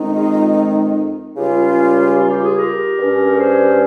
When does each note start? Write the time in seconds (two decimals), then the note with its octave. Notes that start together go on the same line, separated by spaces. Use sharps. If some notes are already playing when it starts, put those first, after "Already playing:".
Already playing: F2 D#3 G#3 C4 D#4
0.14 F4 G#4
1.35 C#2 C#3 G3 C#4 F4 G4
2.16 F4
2.29 G4
2.42 F4 G#4
2.56 G4 A#4
2.97 G2 G3 C#4
3.37 G#4 C5